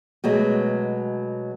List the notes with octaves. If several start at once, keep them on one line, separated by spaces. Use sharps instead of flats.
B2 F#3 G#3 A3